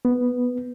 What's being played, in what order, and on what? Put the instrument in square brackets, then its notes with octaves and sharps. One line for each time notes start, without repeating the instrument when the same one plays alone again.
[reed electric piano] B3